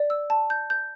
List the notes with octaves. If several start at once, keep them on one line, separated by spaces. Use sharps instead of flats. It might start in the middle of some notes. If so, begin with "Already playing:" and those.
Already playing: D5
E6
A5
G6
G6